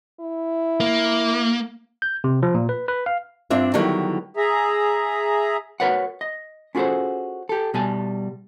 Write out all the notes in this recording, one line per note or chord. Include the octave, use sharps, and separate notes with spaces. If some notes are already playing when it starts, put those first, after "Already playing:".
E4
A#3
G6
C3
F3
A#2
B4
B4
F5
G2 C4 D4 F4 E5
D3 D#3 F#3 G3 B3 E4
G#4 E5 A#5
F#4 A#4 B4 C#5 F#5
D#5
C#4 F4 F#4 G#4 A4 C5
G4 A4
B2 G3 G#5 A5